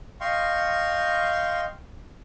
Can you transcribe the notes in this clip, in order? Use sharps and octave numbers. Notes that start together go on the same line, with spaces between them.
D#5 F5 G5 C6 C#6